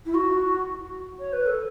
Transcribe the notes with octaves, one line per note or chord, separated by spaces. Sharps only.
E4
F#4
C#5
B4
A4